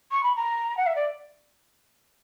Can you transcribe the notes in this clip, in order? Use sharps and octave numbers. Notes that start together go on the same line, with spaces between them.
C#6
B5
A#5
F#5
E5
D5